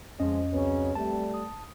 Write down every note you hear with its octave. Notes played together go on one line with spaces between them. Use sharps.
F2 F3 G#3 C#4 D#5
C#2 C#3 F#3 C4 C#4 B4
G3 A3 A5
D#6